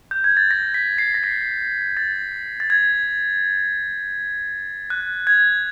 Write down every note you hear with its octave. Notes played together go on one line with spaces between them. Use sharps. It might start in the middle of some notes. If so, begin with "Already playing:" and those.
G6
G#6
A6
A#6
B6
C7
A#6
B6
A6
A6
G#6
F#6
G#6